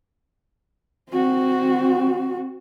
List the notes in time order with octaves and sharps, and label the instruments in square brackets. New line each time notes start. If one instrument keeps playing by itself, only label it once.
[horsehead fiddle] C4 F#4